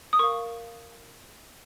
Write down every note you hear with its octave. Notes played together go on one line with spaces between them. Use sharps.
D#6
A#4 F5 C#6